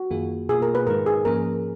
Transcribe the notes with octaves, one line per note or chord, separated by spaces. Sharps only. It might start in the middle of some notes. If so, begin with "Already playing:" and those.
Already playing: F#4
F#2 D#3 A#3 F4 G#4
B2 A#3 F4 G#4
A#4
B4
G#2 D#3 G#3 D#4 A#4
G#4
G#2 F3 A#3 C#4 G#4 A#4